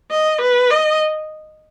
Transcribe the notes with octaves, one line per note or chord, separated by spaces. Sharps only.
D#5
B4
D#5